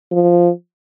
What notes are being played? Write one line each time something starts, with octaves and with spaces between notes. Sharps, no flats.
F3